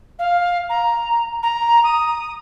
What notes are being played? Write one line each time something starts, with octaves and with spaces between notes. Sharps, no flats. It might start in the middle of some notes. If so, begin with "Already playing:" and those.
F5
A#5
A#5
D#6